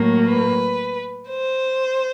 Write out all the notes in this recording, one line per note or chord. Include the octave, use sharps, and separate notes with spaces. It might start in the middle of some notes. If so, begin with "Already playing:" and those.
Already playing: A2 F#3 A#3
B4
C5